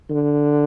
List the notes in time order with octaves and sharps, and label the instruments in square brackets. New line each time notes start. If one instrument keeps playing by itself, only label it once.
[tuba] D3